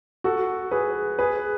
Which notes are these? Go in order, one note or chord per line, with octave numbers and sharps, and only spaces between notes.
F#4 A4
G#4 B4
G#4 B4